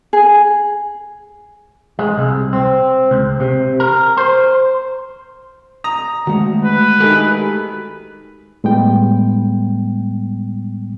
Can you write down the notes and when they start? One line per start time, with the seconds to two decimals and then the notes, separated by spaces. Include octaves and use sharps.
0.13 G#4
1.99 G#3
2.18 C2
2.53 C4
3.11 C#2
3.40 C3
3.80 A#4
4.17 C5
5.84 A#5 D#6
6.27 D#3 G#3 A3 F#4
6.65 B4
7.00 D#3 A3 G4 G#4 A#4
8.64 A2 G3 G#3 B3 G5